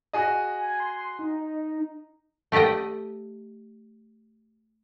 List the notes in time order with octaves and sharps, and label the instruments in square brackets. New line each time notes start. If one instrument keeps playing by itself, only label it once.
[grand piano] F#4 G#4 D#5
[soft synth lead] G#5
C6
D#4
[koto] A3 G4 D5 D#5 G5